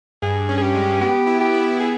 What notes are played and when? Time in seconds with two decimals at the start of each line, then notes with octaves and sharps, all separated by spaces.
0.22 G2 G#4
0.49 C#4
0.57 G#4
0.62 G4
0.74 G#3
1.01 B3 G4
1.27 E4
1.40 G4
1.54 E4
1.79 B3 G#4